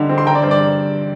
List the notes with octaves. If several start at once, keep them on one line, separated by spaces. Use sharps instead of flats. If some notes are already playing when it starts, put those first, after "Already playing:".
Already playing: D3 G3 D#4
C4
C6
D3 G5 A#5
D5
G2 C5
D5